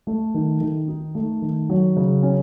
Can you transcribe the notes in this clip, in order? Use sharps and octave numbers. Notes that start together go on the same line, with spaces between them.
A3
D#3
D#3
D#4
A3
D#3
F#3
C#3
C#4